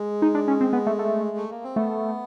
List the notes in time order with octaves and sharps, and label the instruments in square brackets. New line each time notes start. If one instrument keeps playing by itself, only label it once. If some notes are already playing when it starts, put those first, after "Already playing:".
Already playing: [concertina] G#3
[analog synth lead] D#4
D4
C#4
C4
B3
A3
A3
[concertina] A3
A#3
C4
[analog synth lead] A3 [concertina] B3